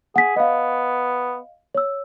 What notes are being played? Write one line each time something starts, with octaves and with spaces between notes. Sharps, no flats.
G#4 F#5 B6
B3 D#5 F5
C#5 E6